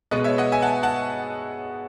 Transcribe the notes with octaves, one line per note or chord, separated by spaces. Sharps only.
B2 G#3 B3 B4 D#5
C#5 E5
D#5 F#5
E5 G#5
F#5 A5
F#5 A5